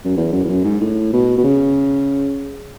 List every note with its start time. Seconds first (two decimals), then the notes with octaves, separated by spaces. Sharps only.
0.05 F#2
0.17 E2
0.33 F#2
0.45 E2
0.49 F#2
0.64 G#2
0.81 A2
1.13 B2
1.38 B2
1.44 C#3